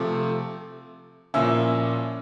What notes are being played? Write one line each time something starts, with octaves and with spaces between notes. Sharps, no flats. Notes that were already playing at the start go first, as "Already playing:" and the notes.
Already playing: C3 F3 A3 D6
A#2 F3 A#3 C#4 E4 E6